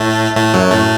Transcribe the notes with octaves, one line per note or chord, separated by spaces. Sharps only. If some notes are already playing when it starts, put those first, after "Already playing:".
Already playing: A2 A3
A2 A3
F#2 F#3
A2 A3